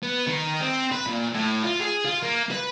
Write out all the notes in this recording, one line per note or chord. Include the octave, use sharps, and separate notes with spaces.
B3
D#3
C4
B4
A#2
A2
F4
G#4
F4
A#3
B4